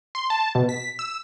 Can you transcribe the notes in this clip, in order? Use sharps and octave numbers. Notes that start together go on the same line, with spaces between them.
C6
A5
B2
B6
E6